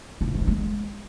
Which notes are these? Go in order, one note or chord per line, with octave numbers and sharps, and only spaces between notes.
F4
E4
G#3
D#4
G#3